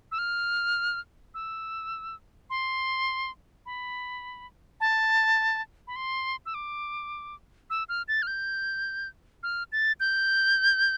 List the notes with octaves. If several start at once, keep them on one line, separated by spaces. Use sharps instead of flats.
E6
F6
E6
C6
B5
A5
B5
C6
E6
D6
E6
F6
A6
F6
G6
F6
A6
G6